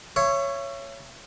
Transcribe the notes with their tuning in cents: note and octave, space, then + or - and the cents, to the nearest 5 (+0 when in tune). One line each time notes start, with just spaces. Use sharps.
C#5 +0 E5 +35